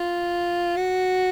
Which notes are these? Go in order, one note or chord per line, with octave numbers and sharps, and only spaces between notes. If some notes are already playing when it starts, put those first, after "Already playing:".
Already playing: F4
F#4